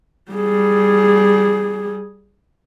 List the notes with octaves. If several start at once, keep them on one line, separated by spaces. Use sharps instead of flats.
G3 G#4